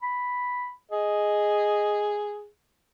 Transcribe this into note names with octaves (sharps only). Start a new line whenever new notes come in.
B5
G#4 D#5